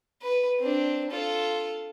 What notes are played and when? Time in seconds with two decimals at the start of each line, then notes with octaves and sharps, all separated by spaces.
0.22 B4
0.60 C4 D4
1.11 F4 A4